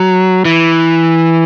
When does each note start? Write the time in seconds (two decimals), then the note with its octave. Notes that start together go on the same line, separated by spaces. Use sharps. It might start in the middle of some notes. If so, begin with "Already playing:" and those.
Already playing: F#3
0.45 E3